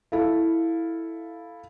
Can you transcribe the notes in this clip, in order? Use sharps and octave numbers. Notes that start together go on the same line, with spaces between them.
E4 A4 F5